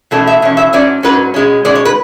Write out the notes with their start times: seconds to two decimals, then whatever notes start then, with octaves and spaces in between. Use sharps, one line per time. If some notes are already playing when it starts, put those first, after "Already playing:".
0.11 E2 B2 A3 C#4 A4
0.27 E5
0.42 E2 B2 C#4
0.57 E5
0.73 G#2 F#3 C#4 D5
1.03 G#2 F#3 C#4 B4
1.34 B2 G#3 C#4
1.65 B2 G#3 C#4 D5
1.75 C#5
1.85 B4